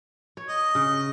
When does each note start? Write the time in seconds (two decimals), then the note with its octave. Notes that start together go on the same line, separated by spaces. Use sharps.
0.37 C#5
0.49 D#5
0.75 C#3